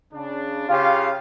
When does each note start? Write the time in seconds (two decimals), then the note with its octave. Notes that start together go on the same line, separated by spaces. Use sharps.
0.12 C#3 D4
0.69 C#3 F4 G4 F5